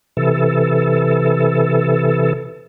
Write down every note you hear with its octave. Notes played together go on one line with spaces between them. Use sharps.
C3 E3 A4